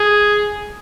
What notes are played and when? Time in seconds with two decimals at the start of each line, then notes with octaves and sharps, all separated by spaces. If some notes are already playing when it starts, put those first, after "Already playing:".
Already playing: G#4